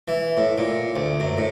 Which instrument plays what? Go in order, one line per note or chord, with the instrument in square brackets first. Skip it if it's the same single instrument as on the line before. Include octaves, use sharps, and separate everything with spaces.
[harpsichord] E3
A2
A#2
D2
F#2
A2